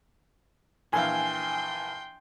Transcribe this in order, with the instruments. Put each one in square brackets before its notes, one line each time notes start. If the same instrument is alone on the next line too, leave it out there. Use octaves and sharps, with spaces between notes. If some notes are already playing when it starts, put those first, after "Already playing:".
[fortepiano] A#1 E3 F5 [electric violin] G5 C6 [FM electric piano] G#5